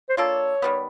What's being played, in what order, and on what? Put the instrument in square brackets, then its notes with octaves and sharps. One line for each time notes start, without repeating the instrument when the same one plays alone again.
[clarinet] C5
[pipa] A#3 D4 F4 A4 [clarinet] C#5
[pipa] D#3 G3 B3